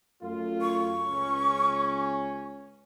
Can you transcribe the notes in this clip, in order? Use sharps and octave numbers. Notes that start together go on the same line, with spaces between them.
F#2 A3 F4
C#6
C#2 C#4